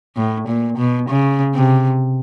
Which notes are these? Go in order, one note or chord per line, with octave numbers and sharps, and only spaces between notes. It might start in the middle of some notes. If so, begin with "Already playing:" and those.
A2
A#2
B2
C#3
C3